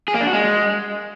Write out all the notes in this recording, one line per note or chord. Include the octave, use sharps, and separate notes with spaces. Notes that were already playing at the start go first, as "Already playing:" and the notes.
G#4
A#3
D4
F#4
G#3